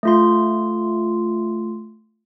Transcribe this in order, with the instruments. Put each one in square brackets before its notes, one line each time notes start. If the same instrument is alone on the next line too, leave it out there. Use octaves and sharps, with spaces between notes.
[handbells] A3 F4 C6